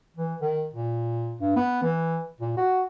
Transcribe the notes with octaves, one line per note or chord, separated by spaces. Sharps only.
E3
D#3
A#2
G2
B3
E3
A#2
F#4